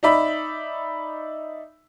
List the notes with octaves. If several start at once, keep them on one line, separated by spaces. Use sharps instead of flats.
D#4 D5 E5 B5